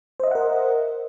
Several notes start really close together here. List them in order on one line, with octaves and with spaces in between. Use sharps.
C5 D#5 E5 F#5 A#4